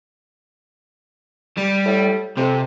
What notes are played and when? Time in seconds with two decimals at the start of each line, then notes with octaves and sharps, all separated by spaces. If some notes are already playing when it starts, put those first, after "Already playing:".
1.58 G3
1.85 A2
2.37 F2 C3